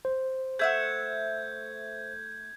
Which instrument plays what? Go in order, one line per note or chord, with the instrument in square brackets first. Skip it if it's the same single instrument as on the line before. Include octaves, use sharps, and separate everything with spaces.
[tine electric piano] C5
[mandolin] A3 E5 F#5 [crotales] G6 G#6